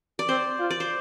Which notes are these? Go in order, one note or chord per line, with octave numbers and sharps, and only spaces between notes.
D5
C4 C5
F4
D5
C5